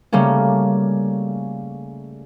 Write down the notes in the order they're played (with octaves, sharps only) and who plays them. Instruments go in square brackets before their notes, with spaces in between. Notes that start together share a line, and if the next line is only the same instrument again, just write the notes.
[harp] C#3 G3 A3 A#3 C#4